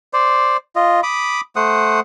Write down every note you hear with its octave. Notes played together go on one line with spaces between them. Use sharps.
C5 D5
F4 D#5
B5 D6 D#6
A3 C5 F#5 D#6